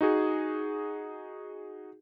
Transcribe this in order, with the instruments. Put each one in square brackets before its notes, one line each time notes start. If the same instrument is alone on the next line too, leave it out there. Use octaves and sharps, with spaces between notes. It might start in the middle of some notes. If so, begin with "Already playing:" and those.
[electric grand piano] D#4 F#4 G#4